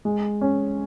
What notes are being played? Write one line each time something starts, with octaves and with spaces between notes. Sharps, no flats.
G#3
C#4